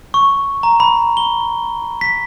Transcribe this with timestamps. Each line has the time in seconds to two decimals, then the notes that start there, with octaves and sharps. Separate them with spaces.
0.14 C#6
0.63 A#5
0.80 B5
1.17 G7
2.01 B6